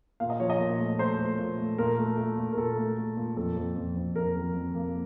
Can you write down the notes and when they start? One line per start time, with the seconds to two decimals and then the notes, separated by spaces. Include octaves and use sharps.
0.20 A#2 F5
0.30 D#5
0.40 F3 C#5
0.50 D#5
0.59 A#2
0.79 A3
0.99 A3 C5
1.19 A3
1.39 A#2
1.58 A3
1.78 A#2 A#4
1.98 A3
2.18 A3
2.38 A#2
2.53 A#4
2.57 A#2 A4
2.77 A3
2.97 A3
3.17 A#2
3.37 F2 A4
3.57 F2
3.76 F2
3.96 F2
4.15 F2 A#4
4.35 F2
4.55 F2
4.75 A#3